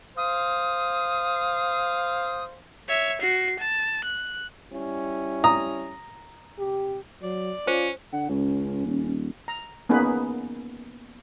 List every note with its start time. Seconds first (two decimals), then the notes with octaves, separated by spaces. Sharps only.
0.17 C5 F5 D#6
2.89 C#5 E5
3.21 F#4 C7
3.60 A5
4.04 F#6
4.72 G3 C#4 E4
5.44 A#5 D#6
6.58 C3 G4
7.23 F#3 D5
7.67 C#4 F4 C5
8.12 D3 F#5
8.29 C#2 C#4
8.86 D#1
9.48 A#5
9.89 A#3 B3 C#4 D#4 G#4 B4